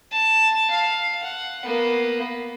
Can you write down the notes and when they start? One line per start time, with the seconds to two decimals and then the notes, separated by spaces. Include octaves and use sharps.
0.12 A5
0.71 F5
1.23 F#5
1.65 A#3 B3